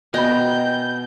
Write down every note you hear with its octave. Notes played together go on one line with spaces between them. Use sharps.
B2 D#5 G5 G#5 A#5 B5 G6